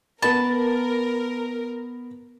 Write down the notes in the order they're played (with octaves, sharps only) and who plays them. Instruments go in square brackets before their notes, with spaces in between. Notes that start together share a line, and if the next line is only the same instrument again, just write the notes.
[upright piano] B3 B5 [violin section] A#4 [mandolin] A5